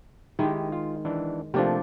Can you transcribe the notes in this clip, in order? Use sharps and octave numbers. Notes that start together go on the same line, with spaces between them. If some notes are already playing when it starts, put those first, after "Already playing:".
D#3 G#3 E4 G4
F4
E3 D4
C3 F3 A3 A#3 D4 G4